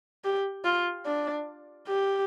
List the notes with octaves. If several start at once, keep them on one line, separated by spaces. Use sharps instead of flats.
G4
F4
D4
G4